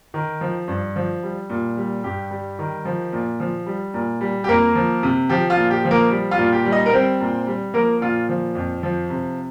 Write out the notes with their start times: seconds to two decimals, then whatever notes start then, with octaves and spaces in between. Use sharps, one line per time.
0.14 D#3
0.41 F3
0.68 G2
0.96 F3
1.23 G3
1.50 A#2
1.77 G3
2.04 G2 G4
2.31 G3
2.59 D#3
2.85 F3
3.13 A#2
3.40 F3
3.66 G3
3.94 A#2
4.21 G3
4.44 G4
4.48 F2 A#3 A#4
4.75 F3
5.03 C3
5.29 F3 G4
5.50 F4
5.57 A#2
5.70 G4
5.85 F3
5.91 A#3 A#4
6.11 G3
6.31 F4
6.38 A#2
6.53 G4
6.65 G3
6.72 D#4 D#5
6.86 A#4
6.93 G3 C4 C5
7.20 A#2
7.47 G3
7.74 F3 A#3 A#4
8.01 A#2 F4
8.29 F3
8.55 F2
8.83 F3
9.10 C3